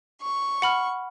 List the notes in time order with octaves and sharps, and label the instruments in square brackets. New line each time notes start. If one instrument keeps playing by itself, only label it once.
[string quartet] C#6
[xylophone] F#5 B5 F6